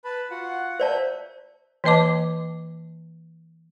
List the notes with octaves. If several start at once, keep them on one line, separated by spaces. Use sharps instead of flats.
B4 A5 B5
F4 F#4 F#5
C5 D5 E5 A5 G6
E3 A#3 B4 D#5 A5 D6